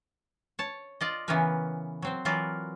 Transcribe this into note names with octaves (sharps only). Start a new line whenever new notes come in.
C#5 A5
F4 D5 D#5
C#3 E3 B3 C#4 A#4 B4
F#3 C4 C5
E3 F#3 E4 F4 A#4 D5